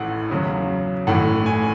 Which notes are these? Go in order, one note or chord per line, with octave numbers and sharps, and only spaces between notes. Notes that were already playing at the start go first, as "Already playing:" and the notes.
Already playing: A1 A2 E3 F#5
E2 C#3 F#3
A1 A2 E3 F#5
G#5